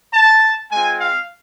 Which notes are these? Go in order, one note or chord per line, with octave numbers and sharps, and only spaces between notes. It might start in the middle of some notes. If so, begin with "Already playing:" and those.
A5
G#3 C4 F4 G#5
F5